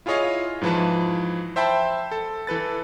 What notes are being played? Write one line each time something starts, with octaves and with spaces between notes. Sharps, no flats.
E4 F4 G#4 C#5 D#5 F5
G#2 E3 F3 B4 A5
C5 E5 G5 A5 B5 C6
A4
E3 A4 B4 A6